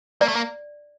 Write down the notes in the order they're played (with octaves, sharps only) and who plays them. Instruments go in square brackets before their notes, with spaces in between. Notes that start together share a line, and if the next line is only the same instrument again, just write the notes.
[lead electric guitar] A#3 [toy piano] D5
[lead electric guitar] A3
A#3